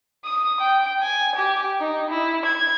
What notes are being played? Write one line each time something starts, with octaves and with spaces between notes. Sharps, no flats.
D#6
G5
G#5
G4
D#4
E4
G#6